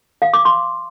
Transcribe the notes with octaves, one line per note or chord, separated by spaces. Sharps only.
F5
D6
C6